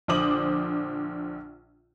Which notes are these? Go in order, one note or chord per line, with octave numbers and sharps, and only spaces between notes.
A#1 D3 C5 D6 D#6 F#7